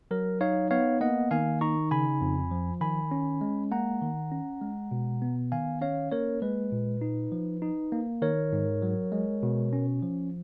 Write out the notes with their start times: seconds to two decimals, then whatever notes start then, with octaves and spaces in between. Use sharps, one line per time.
0.11 F#3 A#4
0.41 D#4 C#5 F5
0.71 B3 C#5 F5
1.01 A#3 D#5 F#5
1.31 D#3 F5 G#5
1.61 D#4 A#5 C#6
1.91 C#3 G#5 B5
2.21 F2
2.51 F3
2.81 D#3 G#5 B5
3.11 C#4
3.41 G#3
3.72 A#3 F#5 A#5
4.02 D#3
4.32 C#4
4.62 G#3
4.91 B2
5.22 B3
5.52 D#3 F5 G#5
5.81 C#4 C#5 F5
6.12 A#3 A#4 C#5
6.42 G#3 B4
6.72 A#2
7.01 D#4
7.32 F3
7.62 D#4
7.92 A#3
8.22 D#3 A#4 C#5
8.53 G#2
8.82 F#3
9.12 G#3
9.43 B2
9.73 C#4
10.02 F3